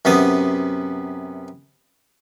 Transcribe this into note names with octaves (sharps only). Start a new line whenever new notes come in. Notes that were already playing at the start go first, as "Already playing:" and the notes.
F#2 C3 B3 D#6